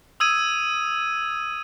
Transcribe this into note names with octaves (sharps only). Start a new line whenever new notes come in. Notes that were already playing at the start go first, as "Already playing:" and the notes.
D#6 E6 G#6 D#7